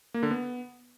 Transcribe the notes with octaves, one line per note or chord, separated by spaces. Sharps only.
A#3
D3
B3